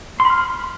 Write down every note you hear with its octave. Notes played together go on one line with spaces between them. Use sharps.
C6
B5
F6